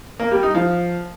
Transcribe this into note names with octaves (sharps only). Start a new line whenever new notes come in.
A#3
G3
D#4
F3